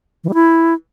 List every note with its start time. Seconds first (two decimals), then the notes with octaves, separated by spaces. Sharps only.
0.24 E3
0.29 G3
0.34 E4